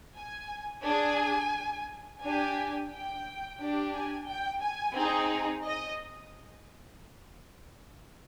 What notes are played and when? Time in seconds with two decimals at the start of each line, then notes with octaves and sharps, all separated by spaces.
0.16 G#5
0.84 D4 G#4 G#5
2.22 D4 G4 G#5
2.91 G5
3.59 D4 G4
3.94 G#5
4.29 G5
4.62 G#5
4.97 C4 D#4 G#4
5.65 D#5